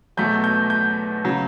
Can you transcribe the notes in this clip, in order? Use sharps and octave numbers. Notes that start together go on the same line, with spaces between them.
E2 B2 F#3 A3 G6
G6
G6
C#3 F#3